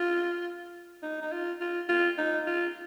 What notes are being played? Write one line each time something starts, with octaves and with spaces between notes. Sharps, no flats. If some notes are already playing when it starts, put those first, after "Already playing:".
Already playing: F4
D#4
D#4
F4
F4
F4
D#4
F4